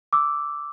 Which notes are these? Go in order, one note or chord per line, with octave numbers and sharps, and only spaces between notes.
D6 E6